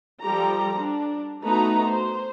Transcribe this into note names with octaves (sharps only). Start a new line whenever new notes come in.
F3 G3 G4 A4 A#5
D4
A3 B3 D#4 F#4 B4 A#5
C5